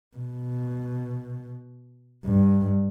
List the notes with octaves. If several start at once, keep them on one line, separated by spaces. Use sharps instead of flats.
B2
G2